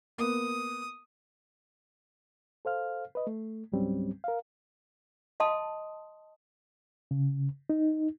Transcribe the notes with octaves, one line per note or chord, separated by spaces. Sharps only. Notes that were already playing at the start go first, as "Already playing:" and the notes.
A#3 B3 D#6
A4 C5 F5 F6
B4 D#5
A3
C#2 G#2 F#3 G3 C4 C#4
A#4 F5
D#5 F5 A5 C6 D#6
C#3
D#4